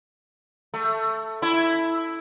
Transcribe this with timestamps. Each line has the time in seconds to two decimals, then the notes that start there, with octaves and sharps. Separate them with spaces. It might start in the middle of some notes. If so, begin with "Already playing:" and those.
0.74 A3
1.42 E4